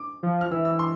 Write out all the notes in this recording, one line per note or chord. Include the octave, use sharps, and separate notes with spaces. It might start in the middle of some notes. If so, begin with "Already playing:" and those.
Already playing: D6
F3
F6
E3 E6
E6
C6